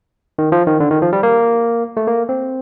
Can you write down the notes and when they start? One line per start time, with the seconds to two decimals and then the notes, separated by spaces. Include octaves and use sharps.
0.38 D#3
0.52 F3
0.67 D#3
0.80 D3
0.91 D#3
1.02 F3
1.13 G3
1.23 A#3
1.97 A3
2.07 A#3
2.29 C4